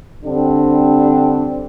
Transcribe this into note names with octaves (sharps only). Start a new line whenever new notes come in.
D3 G3 C4 D4